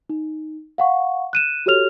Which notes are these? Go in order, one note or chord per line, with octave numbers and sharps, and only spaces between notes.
D#4
F5 F#5 C#6
F#6 D#7 E7
F#4 G4 A4 C#5 F6 F7